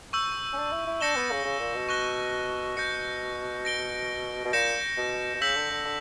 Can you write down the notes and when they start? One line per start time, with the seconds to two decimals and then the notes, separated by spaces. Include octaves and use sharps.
0.13 C#6 E6 G6
0.53 C#4
0.57 D4
0.72 E4
0.87 E4
1.01 D4 G6 A#6 C#7 E7 G7
1.16 B3
1.31 C#3
1.44 C#3
1.59 A#2
1.74 B2
1.89 C#6 F#6 A#6 E7 G7
2.77 B2 G6 A#6 C#7
3.65 A#6 D7 G7
4.45 B2
4.53 A#2 G6 A#6 C#7 E7
4.97 B2
5.35 B2
5.41 C#3 E6 G6 B6 F#7
5.56 D3
5.71 D3
5.85 D3